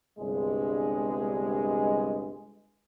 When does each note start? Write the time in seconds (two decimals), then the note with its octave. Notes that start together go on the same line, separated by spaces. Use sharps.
0.19 G1 C2 G2 G#3